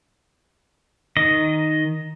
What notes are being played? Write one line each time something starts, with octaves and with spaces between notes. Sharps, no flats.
D#3 D#5